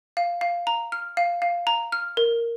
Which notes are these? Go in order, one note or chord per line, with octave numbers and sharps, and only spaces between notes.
F5
F5
A#5
F6
F5
F5
A#5
F6
A#4